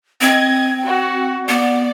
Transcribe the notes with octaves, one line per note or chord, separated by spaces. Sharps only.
C4 D#5 G#6
F#4 F#5
B3 D5